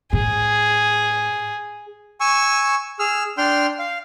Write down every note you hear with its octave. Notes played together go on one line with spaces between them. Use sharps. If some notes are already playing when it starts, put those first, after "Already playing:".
A2 G#4
G#5 C#6 E6
G#4 E6 F6
D4 G5 C6 F6
F5